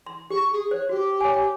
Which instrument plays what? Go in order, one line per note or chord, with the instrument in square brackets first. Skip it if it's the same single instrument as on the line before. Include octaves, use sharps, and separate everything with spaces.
[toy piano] C6
[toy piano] G4 [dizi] C#6
[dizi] G#4
[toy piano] C5 [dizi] C#5
[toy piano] F#4 [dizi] G4
[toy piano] C#5 G#5